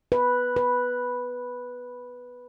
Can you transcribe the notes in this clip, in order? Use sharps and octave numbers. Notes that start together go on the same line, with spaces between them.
B4
B4